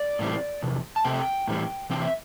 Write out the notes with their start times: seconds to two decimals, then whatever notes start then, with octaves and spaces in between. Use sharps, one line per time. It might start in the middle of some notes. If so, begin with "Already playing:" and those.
Already playing: D5
0.19 A2 E3 G3 C4
0.62 E2 C3
0.96 A5
1.05 C3 A3 C4 G5
1.48 A2 E3 G3 C4
1.90 C3 E3 C4 G5
2.01 E5